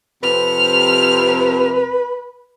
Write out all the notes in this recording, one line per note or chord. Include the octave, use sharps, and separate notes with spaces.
F2 C3 B4 F6